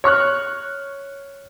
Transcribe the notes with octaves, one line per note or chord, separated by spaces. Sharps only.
C#5 C#6 F6 F#6